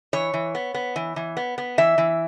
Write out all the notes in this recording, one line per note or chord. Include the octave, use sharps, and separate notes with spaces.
E3 C#5
E3
B3
B3
E3
E3
B3
B3
E3 E5
E3